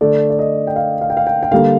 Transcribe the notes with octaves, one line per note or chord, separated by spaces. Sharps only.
D3 A3 D5
D5
D#5
G5
F5
F5
G5
F5
G5
G5
D3 G3 A#3 F5